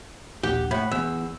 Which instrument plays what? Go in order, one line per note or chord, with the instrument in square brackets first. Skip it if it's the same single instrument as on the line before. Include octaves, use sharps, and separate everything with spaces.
[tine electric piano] A#1 D#2 F#5 [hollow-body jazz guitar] G4
[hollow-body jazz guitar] A2 [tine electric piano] F#5 B5
[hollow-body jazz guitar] E2 [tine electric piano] E6